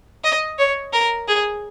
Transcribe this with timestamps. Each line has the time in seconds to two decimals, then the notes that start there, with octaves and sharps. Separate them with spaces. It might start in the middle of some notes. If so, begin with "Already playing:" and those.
0.24 D#5
0.59 C#5
0.93 A#4
1.28 G#4